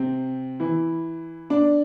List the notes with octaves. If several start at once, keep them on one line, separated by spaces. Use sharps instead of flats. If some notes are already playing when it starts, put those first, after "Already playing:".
Already playing: C3 C4
E3 E4
D4 D5